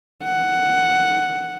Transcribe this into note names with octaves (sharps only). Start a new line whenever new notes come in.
F#5